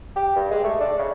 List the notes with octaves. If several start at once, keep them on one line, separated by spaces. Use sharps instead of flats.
G4
G2
G#3
A3
D4
C#3